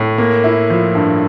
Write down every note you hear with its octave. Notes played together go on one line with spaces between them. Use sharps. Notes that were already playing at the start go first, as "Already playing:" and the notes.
Already playing: A2
A#3
E4
F3
G2